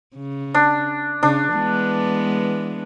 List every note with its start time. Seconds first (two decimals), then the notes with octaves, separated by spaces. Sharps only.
0.16 C#3
0.54 D4
1.23 C#3 D4
1.54 E3 G#3 B3